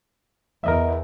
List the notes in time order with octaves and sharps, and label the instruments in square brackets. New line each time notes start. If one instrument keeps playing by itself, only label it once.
[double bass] E2 [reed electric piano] A#4 D#5 E5